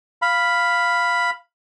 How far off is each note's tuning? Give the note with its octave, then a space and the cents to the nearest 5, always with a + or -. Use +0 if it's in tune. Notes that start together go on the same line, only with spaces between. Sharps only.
F5 +0 B5 +0